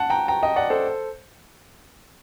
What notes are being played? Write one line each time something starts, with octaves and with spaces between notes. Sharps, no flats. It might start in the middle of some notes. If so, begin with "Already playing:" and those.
Already playing: F#5 A5
G5 A#5
G5 A#5
D#5 G5
D5 F#5
A4 C5